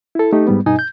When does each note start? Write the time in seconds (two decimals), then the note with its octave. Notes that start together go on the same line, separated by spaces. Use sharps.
0.15 E4 A4
0.33 A3 D#4 G4
0.47 G#2 G3 B3
0.66 G2 B2 D#4 D#5 G#5
0.79 G6